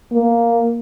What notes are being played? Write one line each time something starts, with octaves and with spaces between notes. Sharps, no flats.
A#3